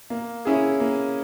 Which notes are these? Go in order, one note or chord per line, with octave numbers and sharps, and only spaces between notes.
A#3
C#4 E4 G#4
A#3